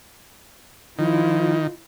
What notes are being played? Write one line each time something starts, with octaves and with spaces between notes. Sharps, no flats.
D#3 F3 E4 F4